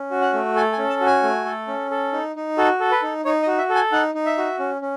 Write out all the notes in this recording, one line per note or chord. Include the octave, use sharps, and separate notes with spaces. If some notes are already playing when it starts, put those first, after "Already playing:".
Already playing: C#4
F#4
F#5
A3
A4 G#5
G#5
C#4
A5
F#4
G#5
A3
A4
C#4
A4
D#4
D#4
F#4 A4
A4
B4
D#4
D#4 C#5
D#5
F#4
E5
A4
G#5
D#4 F#5
D#4
E5
F#4
C#4
C#4